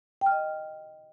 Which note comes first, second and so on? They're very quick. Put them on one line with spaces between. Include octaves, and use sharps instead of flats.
G5 F6 D#5